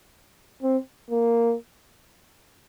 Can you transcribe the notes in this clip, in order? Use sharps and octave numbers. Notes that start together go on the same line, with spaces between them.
C4
A#3